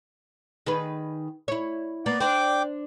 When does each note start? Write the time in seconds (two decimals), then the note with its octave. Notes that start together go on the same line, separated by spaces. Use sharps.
0.66 D#3 G#4 B4
1.48 E4 C#5
2.06 A#3 B3 D5
2.20 D4 C5 G5 D6